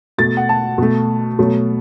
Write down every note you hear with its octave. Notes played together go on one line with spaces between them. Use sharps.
B2 A3 A6
F#5
A5
B2 A3
B2 F#3 A3